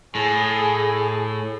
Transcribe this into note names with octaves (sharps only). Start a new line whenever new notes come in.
A2 G#4